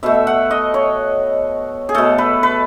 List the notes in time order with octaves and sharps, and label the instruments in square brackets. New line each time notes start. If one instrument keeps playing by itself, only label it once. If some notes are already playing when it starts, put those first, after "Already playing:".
[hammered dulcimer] B2 A3 E5
F#5
D#5
C#5
G#4
B2 A3 A4
B4
B4